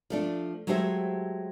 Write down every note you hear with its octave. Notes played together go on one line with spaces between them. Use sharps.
F3 A3 D4
F#3 G#3 A3 G4 C5 E5